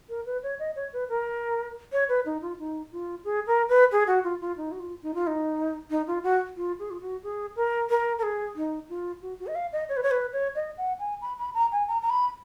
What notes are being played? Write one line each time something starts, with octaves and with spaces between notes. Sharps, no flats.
A#4
B4
C#5
D#5
C#5
B4
A#4
C#5
B4
D#4
F4
D#4
F4
G#4
A#4
B4
G#4
F#4
F4
F4
D#4
F#4
F4
D#4
F4
D#4
D#4
F4
F#4
F4
G#4
F4
F#4
G#4
A#4
A#4
A#4
G#4
D#4
F4
F#4
F#4
D#5
F5
D#5
C#5
B4
C#5
B4
C#5
D#5
F#5
G#5
B5
B5
A#5
G#5
A#5
A#5
B5